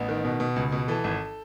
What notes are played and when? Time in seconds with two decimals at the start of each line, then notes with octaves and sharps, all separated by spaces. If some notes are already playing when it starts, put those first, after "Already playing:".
Already playing: A1 B3
0.09 D#3
0.25 B2
0.40 B2
0.56 C#2
0.72 B2
0.88 E3 A4
1.04 G#1